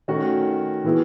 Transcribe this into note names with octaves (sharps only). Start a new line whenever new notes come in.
D#3 A3 C#4 F#4
E3 B3 E4 G#4